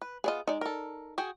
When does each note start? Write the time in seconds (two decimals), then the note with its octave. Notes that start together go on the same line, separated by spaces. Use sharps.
0.02 B4
0.24 B3 F4 G#4 D5 D#5
0.48 G#3 D#4 D5
0.61 A4 A#4
1.18 F#4 G#4 G5